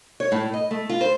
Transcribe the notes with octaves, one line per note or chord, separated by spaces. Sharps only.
C#5
A2
D#5
A3
F4
C5